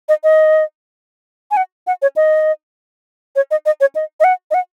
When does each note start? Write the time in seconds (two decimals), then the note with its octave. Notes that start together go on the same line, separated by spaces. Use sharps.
0.09 D#5
0.24 D#5
1.51 G#5
1.57 F#5
1.87 F#5
2.02 C#5
2.16 D#5
3.36 C#5
3.51 D#5
3.66 D#5
3.81 C#5
3.95 D#5
4.20 D#5
4.24 F#5
4.51 D#5
4.54 F#5